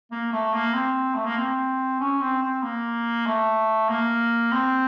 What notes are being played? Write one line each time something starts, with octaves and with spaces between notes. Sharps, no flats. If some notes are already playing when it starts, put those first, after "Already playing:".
A#3
A3
A#3
C4
A3
A#3
C4
C#4
C4
C4
A#3
A3
A#3
C4